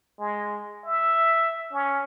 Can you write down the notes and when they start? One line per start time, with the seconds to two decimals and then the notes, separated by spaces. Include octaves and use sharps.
0.19 G#3
0.85 E5
1.72 C#4